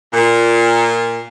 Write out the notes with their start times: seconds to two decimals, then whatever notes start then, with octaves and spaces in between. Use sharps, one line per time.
0.13 A#2